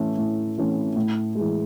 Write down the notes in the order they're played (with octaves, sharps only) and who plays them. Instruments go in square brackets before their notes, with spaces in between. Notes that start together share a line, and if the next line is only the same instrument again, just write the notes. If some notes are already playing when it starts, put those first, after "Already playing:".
Already playing: [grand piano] A2 E3 A3 C#4
A2
E3 A3 C#4
A2
E3 G#3